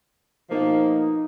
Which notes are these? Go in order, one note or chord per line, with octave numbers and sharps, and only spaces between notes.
B2 F3 A#3 D#4